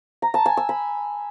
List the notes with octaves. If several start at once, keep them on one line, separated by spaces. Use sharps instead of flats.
A#5
A5
G#5
E6
B5